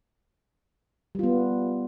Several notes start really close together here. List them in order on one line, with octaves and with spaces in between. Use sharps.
G3 F4 B3